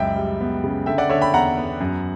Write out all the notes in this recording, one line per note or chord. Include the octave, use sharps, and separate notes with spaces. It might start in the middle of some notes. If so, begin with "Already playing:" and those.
Already playing: C#2 F#2 E5 G5
G3
B3
C#3
D3 E5 G5
D5 F#5
D3 C#5 E5
G5 B5
E2 F#5 A#5
B3
F#2